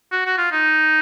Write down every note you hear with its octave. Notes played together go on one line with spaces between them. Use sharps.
F#4
F#4
F4
D#4